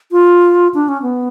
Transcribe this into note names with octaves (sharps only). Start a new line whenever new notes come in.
F4
D4
C#4
B3